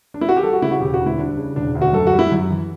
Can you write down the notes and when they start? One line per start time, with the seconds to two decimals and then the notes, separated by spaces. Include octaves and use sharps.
0.14 D4
0.21 E4
0.29 F#4
0.36 G4
0.43 G3 A4
0.53 F#4
0.62 C#3 E4
0.71 F#4
0.81 E1 G4
0.94 F#4
1.00 D2
1.06 E4
1.18 G3 D4
1.37 C#3
1.56 E1 D4
1.75 D2
1.81 F#4
1.93 F#2 A4
2.07 F#4
2.13 G3
2.19 E4
2.32 F#2
2.50 E3